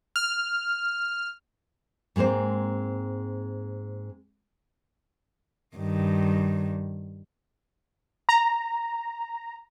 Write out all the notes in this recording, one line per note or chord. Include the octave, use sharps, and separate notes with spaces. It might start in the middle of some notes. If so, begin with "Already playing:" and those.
F6
G#2 G#3 A#3 C4 C5
G2 D#3
A#5